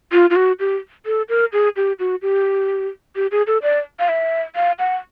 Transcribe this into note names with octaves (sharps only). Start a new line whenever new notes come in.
F4
F4
F#4
G4
A4
A#4
G#4
G4
F#4
G4
G4
G#4
A4
D5
F5
E5
F5
F#5